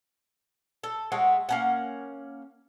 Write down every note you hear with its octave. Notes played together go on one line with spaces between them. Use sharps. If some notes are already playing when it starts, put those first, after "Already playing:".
A4
G#3 A3 F#4 C#5
A#3 C#4 F#5